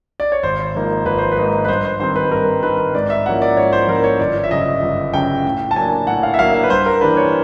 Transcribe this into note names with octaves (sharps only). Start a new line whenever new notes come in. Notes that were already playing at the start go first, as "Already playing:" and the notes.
D5
C#5
G#1 C5
G#2 F3 A#3 D#4
G#1 B4
C5
B4
G#2 F3 A#3 D#4
B4
G2 C5
C5
D#3 G3 C4 C5
B4
G2 A#4
D#3 G3 C4 B4
G#2 D5
E5
F3 A#3 C#4 E4 F#5
D5
G#2 C#5
C5
F3 A#3 C#4 E4 A#4
C#5
G1 D5
E5
F#2 C#3 D#5
G1
F#2 C#3 G5
A2
A5
F#3 A#3 D4 G#5
A2 F#5
F5
E5
F#3 A#3 D4 F5
E5
B4
G2 C5
A#4
E3 G3 A#3 D4 B4
C#5